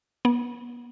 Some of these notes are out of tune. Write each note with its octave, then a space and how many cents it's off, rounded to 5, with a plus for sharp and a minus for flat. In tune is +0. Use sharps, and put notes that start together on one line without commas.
B3 -35